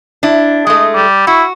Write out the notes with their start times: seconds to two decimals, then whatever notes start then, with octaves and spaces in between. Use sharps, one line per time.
0.23 D4 E4
0.67 G#3 A3 D#5
0.95 G3
1.27 E4 F#4